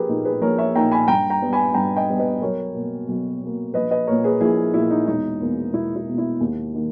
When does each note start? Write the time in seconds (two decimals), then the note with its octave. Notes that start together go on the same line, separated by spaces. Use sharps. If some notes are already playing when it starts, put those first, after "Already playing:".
Already playing: A#1 G4 G#4 A#4 B4
0.08 A#2 A#3 D#4
0.25 G#4 B4
0.41 A#1 A#4 C#5
0.58 C#5 E5
0.75 A#2 A#3 D#4 G5 A#5
0.91 G#5 B5
1.08 G2 G5 A#5
1.30 G5 A#5
1.41 G3 B3
1.53 G#5 B5
1.74 G2 G5 A#5
1.96 D#5 G5
2.08 G3 B3
2.19 B4 D#5
2.42 B1 A#4 C#5
2.75 B2 A#3
3.08 B1
3.41 B2 A#3
3.74 A#1 B4 D#5
3.91 B4 D#5
4.07 A#2 A#3 A#4 C#5
4.24 G#4 B4
4.41 A#1 E4 G#4
4.74 A#2 A#3 E4
4.91 D#4
5.08 E1 D#4
5.41 E2 B2 A#3
5.73 E1 E4
5.96 E4
6.07 E2 B2 A#3
6.18 E4
6.41 D#2
6.74 D#3 A#3